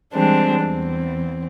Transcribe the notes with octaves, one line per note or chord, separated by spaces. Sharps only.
E3 G3 G#3 C4 D4
E2 C4